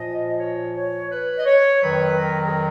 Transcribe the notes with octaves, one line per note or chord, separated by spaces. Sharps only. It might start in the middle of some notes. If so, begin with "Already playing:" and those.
Already playing: A#2 F3 D#5
C#5
C#5
B4
D#5
C#5
F2 D#3 F#3 B4
A#4
G#4
A#4